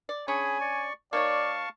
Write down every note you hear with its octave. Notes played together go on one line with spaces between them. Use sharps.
D5
C#4 D4 G#4 C#5 G#5 B5
D5 C#6
A#3 D#4 C#5 D5 F5 A5 C#6